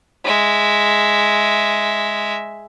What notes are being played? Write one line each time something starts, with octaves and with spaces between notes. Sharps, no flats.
G#3 E5